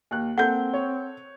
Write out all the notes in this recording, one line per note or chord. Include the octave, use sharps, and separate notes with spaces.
D#2 F#6
A#3 C4 A4 F#5 G6 G7
C#5